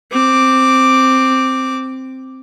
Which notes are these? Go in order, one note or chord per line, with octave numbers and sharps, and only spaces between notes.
C4 D6